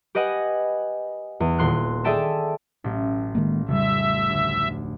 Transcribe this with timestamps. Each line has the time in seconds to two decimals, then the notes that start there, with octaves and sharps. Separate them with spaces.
0.15 G4 B4 D#5 F#5 G#5
1.40 E2
1.58 D#1 C6 F#6
2.04 G#4 A4 D5 E5 G5 A5
2.84 A1 F#3
3.35 D#3 G#3 A#3
3.69 F1 C#3 G3 E5
4.29 D2